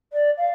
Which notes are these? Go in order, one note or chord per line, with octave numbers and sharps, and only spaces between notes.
D5
F5